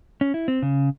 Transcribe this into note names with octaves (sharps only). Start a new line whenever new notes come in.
C#4
E4
C4
C#3